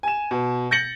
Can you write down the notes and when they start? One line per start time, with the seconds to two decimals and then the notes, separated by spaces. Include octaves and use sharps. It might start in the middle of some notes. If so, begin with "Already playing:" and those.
0.03 G#5 E7
0.31 B2
0.71 G6 A6 A#6 C#7 F#7